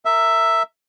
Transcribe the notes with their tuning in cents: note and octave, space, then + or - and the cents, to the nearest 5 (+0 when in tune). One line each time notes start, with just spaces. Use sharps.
A#4 -20 E5 +5